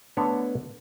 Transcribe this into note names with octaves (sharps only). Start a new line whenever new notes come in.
D3 A3 B3 D4 C#5